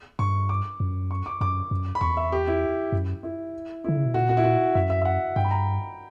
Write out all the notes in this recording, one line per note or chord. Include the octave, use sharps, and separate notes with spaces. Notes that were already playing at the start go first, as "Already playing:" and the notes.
G2 C#6
D6
F#2
C#6
D6
F#2 D6
F#2
B5
E2 C#6
E5
G4
E4
F#2
E4
D3 E4
C#3
B2
A#2 F#4
F#4
E4
F#4
F#2 E5
E5
E5
F#5
G2 G5
B5
A#5